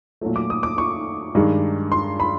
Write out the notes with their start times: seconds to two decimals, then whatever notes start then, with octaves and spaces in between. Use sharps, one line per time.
0.21 A#2 F#3 A3
0.36 D6
0.50 D#6
0.63 D6
0.78 C#6
1.35 G2 D#3 G#3
1.92 C6
2.20 B5